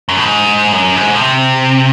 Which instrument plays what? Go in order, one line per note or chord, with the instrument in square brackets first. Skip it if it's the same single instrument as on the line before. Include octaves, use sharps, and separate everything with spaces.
[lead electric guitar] F#2
A2
G#2
F#2
G#2
A2
C3